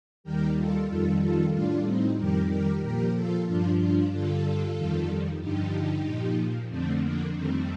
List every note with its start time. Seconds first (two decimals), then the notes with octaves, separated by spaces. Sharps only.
0.24 D#2 D#3 G3 G4 A#4
0.56 F4 A4
0.88 F2 D#3 G3 F4 A4
1.20 F4 A4
1.53 A2 G3 D4 F4
1.85 C4 D#4
2.18 F2 D#3 G3 G4 A#4
2.50 G4 A#4
2.82 A#2 F3 G4 A#4
3.14 F4 A4
3.47 G2 F3 D4 F4
3.79 D4 F4
4.11 G2 D3 G3 F4 A4
4.76 F2 D#3 G3
5.40 G2 D3 F3 D#4 G4
6.05 A#2 F3
6.69 F2 D3 F3 A3 C4
7.01 A#3 D4
7.34 F2 D#3 G3 A3 C4